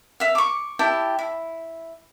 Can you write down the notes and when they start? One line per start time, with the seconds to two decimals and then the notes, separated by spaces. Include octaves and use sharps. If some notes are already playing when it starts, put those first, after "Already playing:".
0.20 E5 F5
0.35 C#6 D6
0.79 E4 G4 G5 A5
1.19 E4